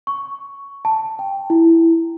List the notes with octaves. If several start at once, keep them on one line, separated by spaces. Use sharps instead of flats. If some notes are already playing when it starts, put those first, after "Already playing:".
C#6
A5
G5
E4